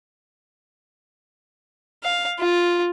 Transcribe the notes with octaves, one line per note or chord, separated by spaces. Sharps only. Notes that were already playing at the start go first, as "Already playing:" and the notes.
F5
F4